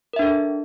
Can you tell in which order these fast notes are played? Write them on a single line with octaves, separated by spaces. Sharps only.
A#4 E5 D4 A4